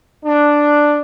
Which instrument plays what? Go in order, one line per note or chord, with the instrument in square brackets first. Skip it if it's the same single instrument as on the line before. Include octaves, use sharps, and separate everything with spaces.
[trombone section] D4